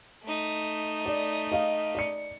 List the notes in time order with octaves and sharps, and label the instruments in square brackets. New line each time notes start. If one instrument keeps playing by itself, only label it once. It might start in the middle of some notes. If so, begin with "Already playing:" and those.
[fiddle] A3 D#4
[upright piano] D5
D#5 F5
D5 C#7